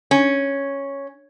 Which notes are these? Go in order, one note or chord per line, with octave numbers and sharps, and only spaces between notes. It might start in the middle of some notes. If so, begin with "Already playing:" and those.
C#4